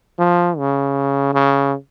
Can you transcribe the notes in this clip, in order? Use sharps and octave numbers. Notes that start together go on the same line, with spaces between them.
F3
C#3
C#3